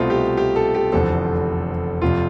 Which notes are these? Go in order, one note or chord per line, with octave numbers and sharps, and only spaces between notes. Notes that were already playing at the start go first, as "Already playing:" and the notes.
Already playing: C2 B2 A3 C4 F4
G4
G4
A4
G4
F1 E2 D3 F3 C4 A4
F1 F2 C3 F4